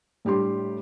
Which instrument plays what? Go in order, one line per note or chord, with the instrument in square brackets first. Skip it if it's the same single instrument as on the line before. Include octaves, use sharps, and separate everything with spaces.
[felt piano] A2 G3 D4 G4 C6